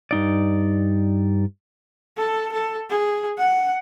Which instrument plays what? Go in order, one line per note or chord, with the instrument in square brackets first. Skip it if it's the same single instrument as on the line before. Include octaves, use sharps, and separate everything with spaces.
[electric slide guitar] G2 D#4 D5
[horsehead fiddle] A4
A4
G#4
F#5